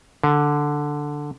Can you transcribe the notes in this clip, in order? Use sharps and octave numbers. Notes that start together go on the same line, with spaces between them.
D3